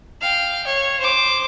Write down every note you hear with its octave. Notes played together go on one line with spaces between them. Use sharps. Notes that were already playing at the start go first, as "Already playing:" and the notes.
F5 G5
C#5
C5 D6